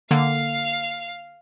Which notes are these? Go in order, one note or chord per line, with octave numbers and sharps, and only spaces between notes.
D3 A#3 F5